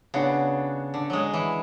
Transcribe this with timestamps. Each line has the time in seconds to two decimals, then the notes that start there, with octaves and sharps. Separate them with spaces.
0.14 C#3 B3 D4 F#4
0.94 D3
1.10 F#3 G#3
1.34 E3